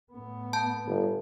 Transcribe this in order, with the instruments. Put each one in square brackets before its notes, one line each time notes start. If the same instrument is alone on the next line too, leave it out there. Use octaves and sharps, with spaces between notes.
[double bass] A2 B3
[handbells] A5 G6
[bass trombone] G1